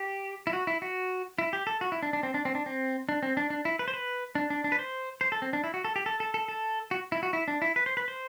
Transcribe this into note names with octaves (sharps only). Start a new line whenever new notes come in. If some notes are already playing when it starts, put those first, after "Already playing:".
Already playing: G4
E4
F#4
E4
F#4
E4
G4
A4
F#4
E4
D4
D4
C4
D4
C4
D4
C4
D4
C4
D4
D4
E4
B4
C5
B4
D4
D4
D4
B4
C5
C5
A4
C4
D4
E4
F#4
A4
G4
A4
A4
A4
A4
F#4
E4
F#4
E4
D4
E4
B4
C5
B4
C5